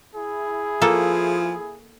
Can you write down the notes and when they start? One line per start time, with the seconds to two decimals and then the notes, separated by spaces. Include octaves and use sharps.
0.16 E4 G#4
0.82 F3 A#3 A4